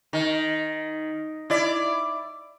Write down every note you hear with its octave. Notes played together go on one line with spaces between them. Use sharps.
D#3
E4 D5